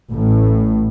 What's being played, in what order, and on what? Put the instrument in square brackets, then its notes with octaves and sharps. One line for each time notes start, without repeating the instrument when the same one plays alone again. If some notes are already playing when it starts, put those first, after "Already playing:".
[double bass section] A1 A2